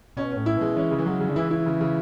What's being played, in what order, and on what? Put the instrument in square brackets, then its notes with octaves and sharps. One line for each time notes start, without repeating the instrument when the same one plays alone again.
[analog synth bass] B2 [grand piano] C#4
[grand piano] C#4
[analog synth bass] A2
[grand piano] E4
[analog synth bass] B2 [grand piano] G#3
[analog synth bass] E3 [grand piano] C#4
[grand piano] C#3
[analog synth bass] E3
[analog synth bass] F#3 [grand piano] G#3
[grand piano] C#3
[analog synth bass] D3
[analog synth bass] E3 [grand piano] E4
[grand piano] E4
C#3
C#3